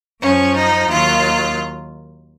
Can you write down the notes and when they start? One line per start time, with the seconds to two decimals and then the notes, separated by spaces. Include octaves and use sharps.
0.21 F#2 F3 C#4
0.55 D#4
0.87 D#2 D#3 F#3 F4